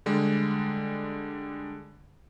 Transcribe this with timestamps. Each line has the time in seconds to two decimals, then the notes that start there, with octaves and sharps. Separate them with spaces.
0.06 D3 G3 G#3